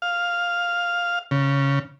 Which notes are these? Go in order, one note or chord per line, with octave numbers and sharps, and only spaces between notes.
F5
C#3